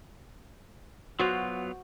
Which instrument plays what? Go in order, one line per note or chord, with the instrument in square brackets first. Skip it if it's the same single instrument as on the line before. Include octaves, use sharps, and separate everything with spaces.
[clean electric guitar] F#3 B3 F4 [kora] F#4 C5